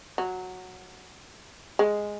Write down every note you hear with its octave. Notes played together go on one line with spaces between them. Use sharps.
F#3
G#3